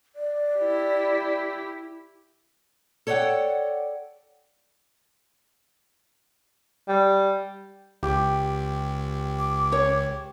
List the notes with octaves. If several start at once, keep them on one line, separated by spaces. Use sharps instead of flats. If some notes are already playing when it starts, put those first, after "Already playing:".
D5
E4 G4
A4 C#5 D5 E5 F#5 G5
G3
C#2 G4
D6
C#5